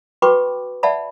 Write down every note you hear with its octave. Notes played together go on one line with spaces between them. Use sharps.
F#4 B4 G5 B5 C#6 D6
D5 E5 F#5 A5 B5